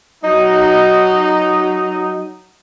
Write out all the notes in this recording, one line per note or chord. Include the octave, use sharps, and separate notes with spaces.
F#3 D#4